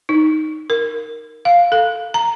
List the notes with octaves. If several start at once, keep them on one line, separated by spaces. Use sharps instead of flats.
D#4
A#4
F5
A4
A#5